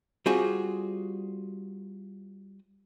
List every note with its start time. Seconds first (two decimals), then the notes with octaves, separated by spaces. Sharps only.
0.26 G3 C4 F4 F#4 G#4